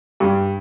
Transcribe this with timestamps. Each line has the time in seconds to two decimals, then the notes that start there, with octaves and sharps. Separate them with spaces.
0.20 G2